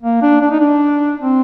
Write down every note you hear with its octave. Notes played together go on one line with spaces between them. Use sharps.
A#3
D4
D4
D#4
D4
C4